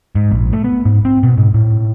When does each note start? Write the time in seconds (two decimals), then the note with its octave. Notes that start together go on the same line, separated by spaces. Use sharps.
0.15 G#2
0.31 A#1
0.53 A3
0.64 B3
0.85 G#2
1.05 C4
1.23 B2
1.38 G#2
1.54 A2